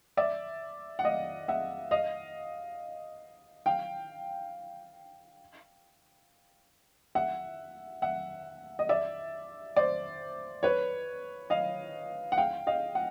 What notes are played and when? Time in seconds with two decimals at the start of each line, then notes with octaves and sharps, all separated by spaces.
0.17 D5 E5
0.99 F#5
1.04 D#5 F5
1.48 E5 F#5
1.91 D#5 F5
3.66 F5 G5
7.15 E5 F#5
8.02 E5 F#5
8.79 D#5
8.89 D5 E5
9.76 C5 D5
10.63 B4 C#5
11.50 D#5 F5
12.32 F#5
12.37 F5 G5
12.67 D#5 F5
12.95 F#5